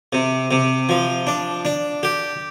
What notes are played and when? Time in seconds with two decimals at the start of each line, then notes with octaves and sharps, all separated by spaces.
0.13 C3
0.51 C3
0.89 F3
1.27 D4
1.65 D4
2.03 G4